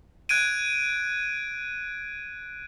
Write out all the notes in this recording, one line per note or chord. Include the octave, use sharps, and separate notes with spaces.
F#6 G#6 D7 D#7